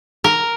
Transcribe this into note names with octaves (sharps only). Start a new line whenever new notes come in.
A#4